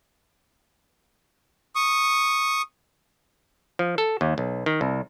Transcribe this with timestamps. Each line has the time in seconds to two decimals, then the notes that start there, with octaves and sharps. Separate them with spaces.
1.76 C#6 D#6
3.79 F3
3.98 A4
4.21 D#2
4.38 B1
4.66 D#3
4.81 C2